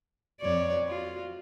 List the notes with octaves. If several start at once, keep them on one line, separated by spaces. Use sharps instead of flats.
F2 C#5 D5
F4 F#4